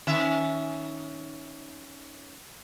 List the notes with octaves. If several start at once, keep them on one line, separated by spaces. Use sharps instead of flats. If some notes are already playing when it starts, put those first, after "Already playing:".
D#3 C#4 E5